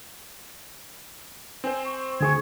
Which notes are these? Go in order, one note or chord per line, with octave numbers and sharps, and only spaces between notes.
C4 C5 G#5
C#6
D2 G#4 C#6 G#6